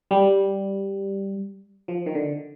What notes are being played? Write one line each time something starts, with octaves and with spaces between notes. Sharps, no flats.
G3
F3
D#3
D3